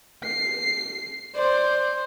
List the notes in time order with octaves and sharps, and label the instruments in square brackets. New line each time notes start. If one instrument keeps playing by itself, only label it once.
[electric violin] C7
[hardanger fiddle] C5 [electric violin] D5